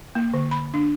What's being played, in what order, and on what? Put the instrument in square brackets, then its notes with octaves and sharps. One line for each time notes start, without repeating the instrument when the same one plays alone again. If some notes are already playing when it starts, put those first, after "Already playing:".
[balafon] A#3
D3
B5
D4